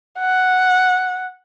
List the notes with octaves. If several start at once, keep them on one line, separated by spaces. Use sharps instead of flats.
F#5